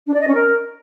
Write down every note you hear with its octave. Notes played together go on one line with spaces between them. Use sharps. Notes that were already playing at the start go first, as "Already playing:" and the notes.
D4
D5
D#5
C#4
A#4